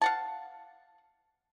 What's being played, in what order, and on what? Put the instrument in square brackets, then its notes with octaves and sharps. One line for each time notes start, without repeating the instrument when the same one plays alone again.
[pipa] F5 F#5 A5